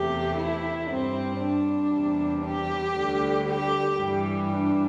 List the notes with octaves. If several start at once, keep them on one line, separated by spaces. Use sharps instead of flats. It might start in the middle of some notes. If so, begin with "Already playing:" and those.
Already playing: E2 C3 A3 G4
E4
G2 G3 C4
D4
E2 C3 G3
G4
D2 D3 G3
G4
G2 E3 G3
D4